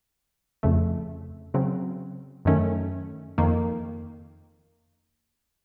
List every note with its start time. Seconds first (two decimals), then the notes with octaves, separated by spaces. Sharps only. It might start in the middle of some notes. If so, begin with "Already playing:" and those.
0.63 F2 C#3 A3
1.54 C#3 F#3 C4
2.45 F#2 D#3 A3 C#4
3.38 F2 D#3 A#3